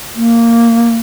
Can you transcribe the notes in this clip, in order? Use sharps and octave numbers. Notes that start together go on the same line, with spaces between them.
A#3